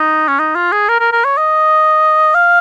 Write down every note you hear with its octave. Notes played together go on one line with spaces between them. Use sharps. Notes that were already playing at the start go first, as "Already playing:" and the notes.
Already playing: D#4
C#4
D#4
F4
G#4
A#4
A#4
A#4
C#5
D#5
F5